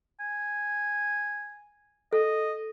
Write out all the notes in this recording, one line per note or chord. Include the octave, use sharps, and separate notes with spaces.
G#5
A4 D#5